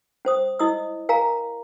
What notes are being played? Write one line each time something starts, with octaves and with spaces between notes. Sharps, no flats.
C#4 C5 D#6
E4 D#5 D#6 E6
A#4 F5 G#5 A#5